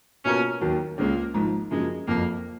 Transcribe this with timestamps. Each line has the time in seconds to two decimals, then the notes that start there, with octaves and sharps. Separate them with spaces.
0.25 B2 A#3 C#4 F4 A#4
0.61 D#2 D#3 F#3
0.98 C#2 C#3 G#3 A#3 C#4 F4
1.34 G#1 G#2 F3
1.71 F#2 C#3 F3 G#3 A#3
2.07 F#1 F2 F3 A#3